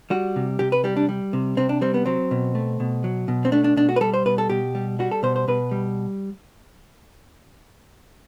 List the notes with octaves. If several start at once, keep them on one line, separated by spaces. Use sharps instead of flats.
G3 F#4
C3
C3 G4
B4
G3 G4
D4
G3
C3
C3 C4
D4
G3 C4
B3
F#3 C4
B2
A3
B2
F#3
B2
C4
A3 D4
D4
B2 D4
F#4
B4
G3 A4
C5
B2 B4
A4
B2 G4
G3
G3 F#4
A4
B2 C5
C5
B2 B4
G3